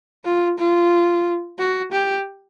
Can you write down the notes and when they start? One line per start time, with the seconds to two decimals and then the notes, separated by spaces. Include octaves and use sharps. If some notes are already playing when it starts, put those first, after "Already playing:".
0.25 F4
0.58 F4
1.58 F#4
1.92 G4